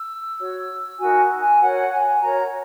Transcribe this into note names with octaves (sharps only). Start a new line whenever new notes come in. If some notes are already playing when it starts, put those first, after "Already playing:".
Already playing: E6
F#4 C#5
D#4 F#4 A#4 G#5
G#5
F#4 A#4 C#5 F#5
G#5
F#4 A#4 C#5 A#5